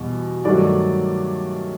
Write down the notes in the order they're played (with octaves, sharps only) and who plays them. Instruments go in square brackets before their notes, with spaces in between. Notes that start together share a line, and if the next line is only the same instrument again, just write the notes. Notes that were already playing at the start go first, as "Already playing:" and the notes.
Already playing: [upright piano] E2 B2 G3
G2 D#3 F#3 A3 D5